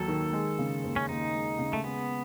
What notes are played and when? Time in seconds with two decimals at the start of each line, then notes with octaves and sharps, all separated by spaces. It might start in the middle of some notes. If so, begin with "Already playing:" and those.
Already playing: D#2 F#3 A4
0.08 D#3
0.33 G#3
0.59 C#3
0.84 D#2
0.96 C#4
1.09 D#2 D#4
1.34 G#3
1.59 C#3
1.73 A3
1.84 G#3 B3